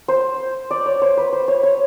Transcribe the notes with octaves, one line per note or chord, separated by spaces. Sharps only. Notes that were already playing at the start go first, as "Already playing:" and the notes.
C5
D5
C#5
C5
B4
C5
C#5
C#5